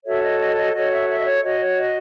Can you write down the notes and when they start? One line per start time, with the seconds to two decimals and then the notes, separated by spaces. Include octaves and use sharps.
0.06 F#4 A4 C#5 E5
0.23 D#5
0.40 D#5
0.57 D#5
0.74 F#4 A4 C#5 D#5
0.91 E5
1.09 E5
1.20 D#5
1.25 C#5
1.43 F#4 C#5 D#5
1.60 C#5
1.77 D#5